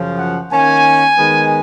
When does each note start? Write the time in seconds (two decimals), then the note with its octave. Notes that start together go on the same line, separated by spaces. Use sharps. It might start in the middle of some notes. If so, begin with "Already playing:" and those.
Already playing: F#2 C#3 F3
0.18 F#5
0.51 D#3 A#3 C#4 G#5
1.17 D#3 G#3 B3